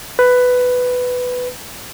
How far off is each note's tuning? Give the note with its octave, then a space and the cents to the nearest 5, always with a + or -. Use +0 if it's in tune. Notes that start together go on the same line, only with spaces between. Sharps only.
B4 +10